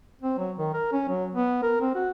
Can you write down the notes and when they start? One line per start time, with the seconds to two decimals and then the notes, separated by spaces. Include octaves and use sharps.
0.22 C4
0.38 F#3
0.58 D#3
0.73 A#4
0.92 C#4
1.09 F#3
1.35 B3
1.62 A#4
1.80 C4
1.95 F#4